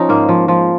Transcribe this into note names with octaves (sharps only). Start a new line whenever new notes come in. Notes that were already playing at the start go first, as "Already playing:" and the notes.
Already playing: F3 C#4 D#4
G#2 A#3
F3
F3